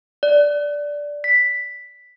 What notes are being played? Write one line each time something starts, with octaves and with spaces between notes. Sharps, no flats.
D5
B6